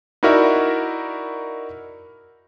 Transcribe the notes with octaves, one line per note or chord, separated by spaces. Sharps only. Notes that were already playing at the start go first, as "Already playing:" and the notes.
D#4 E4 F#4 A#4 D5 E5